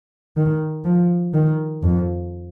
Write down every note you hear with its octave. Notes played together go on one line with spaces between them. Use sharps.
D#3
F3
D#3
F2